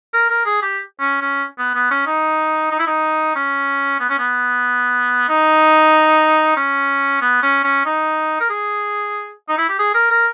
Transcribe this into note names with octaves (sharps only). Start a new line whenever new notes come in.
A#4
A#4
G#4
G4
C#4
C#4
B3
B3
C#4
D#4
D#4
E4
D#4
C#4
B3
C#4
B3
D#4
C#4
B3
C#4
C#4
D#4
A#4
G#4
D#4
E4
G4
G#4
A#4
A#4